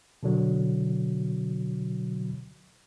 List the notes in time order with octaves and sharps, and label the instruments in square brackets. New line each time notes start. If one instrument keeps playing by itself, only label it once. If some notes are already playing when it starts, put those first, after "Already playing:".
[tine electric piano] B2 D3 F#3